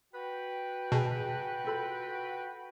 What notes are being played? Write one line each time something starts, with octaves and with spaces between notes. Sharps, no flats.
F#4 B4 G5
B2 G#4 G#5 A5
F4 A4 B5